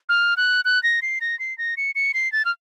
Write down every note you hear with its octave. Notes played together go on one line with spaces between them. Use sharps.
F6
F#6
F#6
A#6
C7
A#6
C7
A#6
C#7
C#7
C7
A6
F6